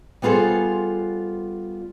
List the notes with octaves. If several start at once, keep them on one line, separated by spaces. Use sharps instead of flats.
G3 B3 F4 G#4 A4 C5